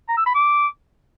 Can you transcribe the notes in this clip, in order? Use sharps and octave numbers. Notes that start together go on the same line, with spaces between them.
A#5
E6
B5
D6